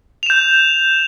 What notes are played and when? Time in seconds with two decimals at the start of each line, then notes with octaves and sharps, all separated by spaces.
0.23 F7
0.26 E7
0.30 G6